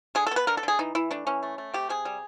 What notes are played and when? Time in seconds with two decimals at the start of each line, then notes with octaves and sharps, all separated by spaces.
0.15 D3 G#4
0.27 A4
0.31 B3 B4
0.47 D3 A#4
0.57 A4
0.63 D3 G#4
0.79 E3 D#4
0.95 E3 E4
1.11 A3 D4
1.27 E3 C#4
1.43 A3
1.58 A3
1.74 C3 G4
1.89 C3 G#4
2.05 G3